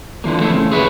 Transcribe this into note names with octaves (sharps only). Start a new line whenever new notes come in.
D3 E3 F3 A#3
A3 C4 E4
C#3
G#4 B4 C#5 E5 F#5